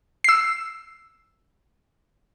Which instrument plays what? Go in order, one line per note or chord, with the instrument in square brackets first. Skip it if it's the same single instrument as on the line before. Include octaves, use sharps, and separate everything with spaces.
[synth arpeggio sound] E6 C7